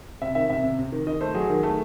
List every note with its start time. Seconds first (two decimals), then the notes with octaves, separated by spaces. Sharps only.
0.22 C3 E5
0.35 D#3 E5
0.50 C3 E5
0.63 C3
0.79 C3
0.92 D#3
1.07 D#3 D#5
1.21 A3 C5
1.34 F#3 G#4
1.50 D#3
1.63 A3